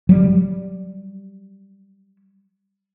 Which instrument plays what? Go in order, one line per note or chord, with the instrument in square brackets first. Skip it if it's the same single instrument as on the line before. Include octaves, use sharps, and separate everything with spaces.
[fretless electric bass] F#3 G3